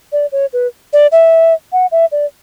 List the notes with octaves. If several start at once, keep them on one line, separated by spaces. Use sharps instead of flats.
D5
C#5
B4
D5
E5
F#5
E5
D5